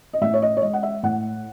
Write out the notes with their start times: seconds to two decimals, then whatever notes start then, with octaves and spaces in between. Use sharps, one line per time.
0.13 D#5
0.21 A2 E5
0.34 C#5
0.42 D#5
0.57 C#5
0.62 G#3 D#5
0.73 F#5
0.83 E5
1.03 A2 F#5